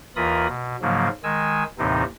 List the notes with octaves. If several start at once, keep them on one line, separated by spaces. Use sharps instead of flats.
D#2 E3 F4 A#4 B5 D#6
B2
G#2 C#3 F3 F#3 A#3
D#3 G#3 G#5 E6
D#2 A2 C3 E3 C4 D#4